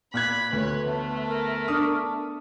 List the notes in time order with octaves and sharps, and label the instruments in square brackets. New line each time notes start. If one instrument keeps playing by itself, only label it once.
[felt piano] A#2 F#6 G#6 [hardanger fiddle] B5
[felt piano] D2 [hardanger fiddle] B4 C#5
[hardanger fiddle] A3 [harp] B3
[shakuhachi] A#4
[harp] D4 A5 C#6 [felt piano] D#6